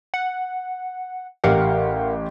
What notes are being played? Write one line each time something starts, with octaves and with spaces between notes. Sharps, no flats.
F#5
A1 G4 A#4 F5 F#5